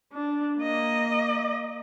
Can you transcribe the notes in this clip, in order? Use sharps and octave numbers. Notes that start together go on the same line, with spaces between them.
D4
A#3 D#5